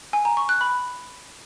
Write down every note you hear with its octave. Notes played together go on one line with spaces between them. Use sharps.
G#5
A#5
C#6
F#6
B5